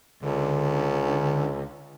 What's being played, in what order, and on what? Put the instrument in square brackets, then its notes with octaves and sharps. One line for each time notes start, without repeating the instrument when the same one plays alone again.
[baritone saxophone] C#2 [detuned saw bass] D3